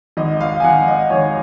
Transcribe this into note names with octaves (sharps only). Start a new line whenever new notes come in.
G#1 D#5
F5
G#5
G#1 F#5
D#5
G#1 C#5